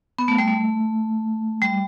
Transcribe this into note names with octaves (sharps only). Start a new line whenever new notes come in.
B3
A3
G3
A3
G3